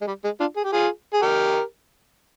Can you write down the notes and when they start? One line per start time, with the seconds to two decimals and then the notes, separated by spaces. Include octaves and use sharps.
0.01 G#3
0.07 G3
0.24 G#3
0.40 D4 F4
0.56 G#4
0.64 G4
0.72 F4 G#4
1.13 G#4
1.21 G4 A#4